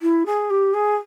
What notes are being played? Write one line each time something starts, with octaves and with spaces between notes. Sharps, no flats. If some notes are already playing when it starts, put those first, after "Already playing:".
E4
G#4
G4
G#4